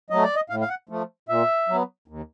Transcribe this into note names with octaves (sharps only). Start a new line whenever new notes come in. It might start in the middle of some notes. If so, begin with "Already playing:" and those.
F#3 A3 D#5
D5
D#5
A2 F5
F5
F#5
F3 A3
A#2 E5
F#3 B3
D#2